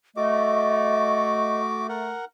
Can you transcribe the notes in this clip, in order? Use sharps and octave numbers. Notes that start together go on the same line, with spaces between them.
A3 F#4 D#5 D6
A#4 F#5